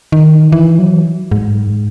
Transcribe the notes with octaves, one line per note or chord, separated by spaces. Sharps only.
D#3
E3
F#3
G#2